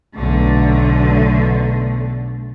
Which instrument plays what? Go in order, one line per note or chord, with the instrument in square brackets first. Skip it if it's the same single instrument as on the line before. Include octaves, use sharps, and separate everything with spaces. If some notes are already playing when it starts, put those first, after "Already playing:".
[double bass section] B1 [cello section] D3 A3